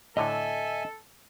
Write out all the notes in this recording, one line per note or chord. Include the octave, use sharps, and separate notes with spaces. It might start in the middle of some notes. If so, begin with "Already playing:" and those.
A2 D3 A4 D#5 E5 G#5 A#5